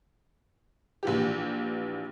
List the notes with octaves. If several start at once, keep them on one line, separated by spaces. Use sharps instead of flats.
A#1 E3 G4